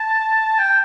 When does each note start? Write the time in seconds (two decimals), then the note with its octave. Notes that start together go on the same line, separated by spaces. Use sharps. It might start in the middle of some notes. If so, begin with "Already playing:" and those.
Already playing: A5
0.59 G5